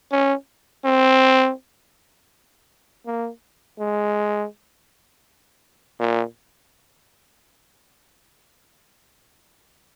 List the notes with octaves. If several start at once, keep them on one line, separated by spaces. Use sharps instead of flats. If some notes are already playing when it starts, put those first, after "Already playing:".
C#4
C4
A#3
G#3
A#2